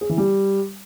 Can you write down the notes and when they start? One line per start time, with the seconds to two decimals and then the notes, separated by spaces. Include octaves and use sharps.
0.01 G#4
0.09 E3
0.18 G3